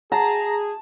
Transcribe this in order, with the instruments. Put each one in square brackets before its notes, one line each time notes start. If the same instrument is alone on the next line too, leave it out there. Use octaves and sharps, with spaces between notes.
[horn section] G#4 [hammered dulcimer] A5 [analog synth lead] A#5